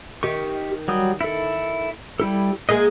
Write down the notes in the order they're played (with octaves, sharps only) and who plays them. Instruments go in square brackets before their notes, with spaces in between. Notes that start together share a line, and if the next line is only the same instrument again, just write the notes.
[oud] D#3 [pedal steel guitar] G4 C#6
[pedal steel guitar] F#3 G3 D#6
E4 A4
G3 E4 A4
[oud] G#3 A#3 G#4 [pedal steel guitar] D#5 G#5